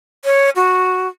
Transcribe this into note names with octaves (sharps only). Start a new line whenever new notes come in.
C#5
F#4